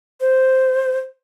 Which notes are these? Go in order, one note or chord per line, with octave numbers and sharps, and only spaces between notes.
C5